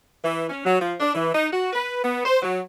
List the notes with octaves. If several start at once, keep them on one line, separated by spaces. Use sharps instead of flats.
E3
C#4
F#3
F3
D4
E3
D#4
F#4
B4
B3
C5
F#3